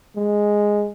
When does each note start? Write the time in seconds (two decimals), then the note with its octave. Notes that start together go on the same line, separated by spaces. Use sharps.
0.16 G#3